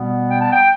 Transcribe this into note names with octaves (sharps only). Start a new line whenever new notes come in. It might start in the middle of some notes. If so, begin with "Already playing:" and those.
Already playing: B2 G3 B3
G5
A5
G5